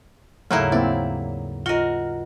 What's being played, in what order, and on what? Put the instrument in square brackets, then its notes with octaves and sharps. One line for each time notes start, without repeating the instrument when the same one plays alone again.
[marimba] D#2 G#2 C#3 [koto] F#3 A#3 E4 [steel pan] A3
[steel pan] A#3 C4 E4 [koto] D5
[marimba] F4 D#5 [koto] F#4 A#4